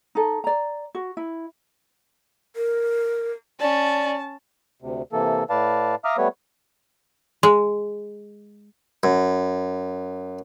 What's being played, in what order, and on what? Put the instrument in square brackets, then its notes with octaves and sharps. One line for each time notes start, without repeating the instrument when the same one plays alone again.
[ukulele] D#4 A4
D5 A#5
F#4
E4
[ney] A#4
[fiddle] C#4 [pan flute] D5 [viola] A5
[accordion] D2 C3
C3 E3 A#3 A4
A2 B4 D5 F5 A5
E5 F5 A#5 D6 D#6 F6
G3 A3 B3 B4 C#5
[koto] G#3
[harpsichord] F#2